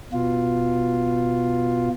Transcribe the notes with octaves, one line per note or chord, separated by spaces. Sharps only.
B2 F4